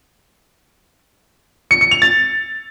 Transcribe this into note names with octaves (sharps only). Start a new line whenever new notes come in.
C#7
C#7
F7
A6